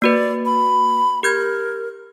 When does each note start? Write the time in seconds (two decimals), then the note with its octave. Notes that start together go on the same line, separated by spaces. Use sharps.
0.02 A#3 F#4 B4 D5
0.45 B5
1.23 G4 A#4 G6 G#6